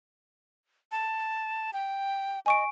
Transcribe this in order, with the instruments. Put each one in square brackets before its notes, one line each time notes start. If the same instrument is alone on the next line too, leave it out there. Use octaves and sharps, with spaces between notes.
[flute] A5
G5
[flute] D#5 [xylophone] G#5 C#6 D7